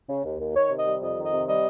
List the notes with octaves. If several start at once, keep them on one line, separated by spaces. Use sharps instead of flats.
C#3
D#2
D#2
D#3 C#5
C3
D#5
G3
F2 D#5
D#3
D#5
C3
G3 D#5